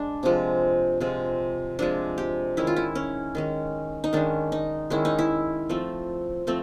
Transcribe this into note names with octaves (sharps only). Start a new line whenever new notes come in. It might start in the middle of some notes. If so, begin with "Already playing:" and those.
Already playing: G#3 D4
C3 F3 G#3
C3 F3 G#3
C3 F3 G#3 D4
G4
D#3 G#3 C#4 E4
F4
E4
C#4
D#3 G#3 C#4
D#4
D#3 G#3 C#4 D4
D#4
D#3 G#3 C#4 E4
D#4
E4
F3 A3 C4
F3 A3 C4